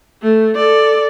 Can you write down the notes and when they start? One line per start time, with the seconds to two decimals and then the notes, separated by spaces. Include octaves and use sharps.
0.23 A3
0.55 A4 D5